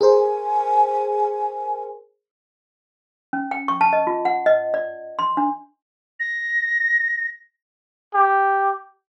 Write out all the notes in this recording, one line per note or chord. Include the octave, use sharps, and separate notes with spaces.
G#4 A#4 C5 G#5
C#4
G5
C#6
A5
D#5
F4
F#5
D#5
D5
C6
D4
A#6
G4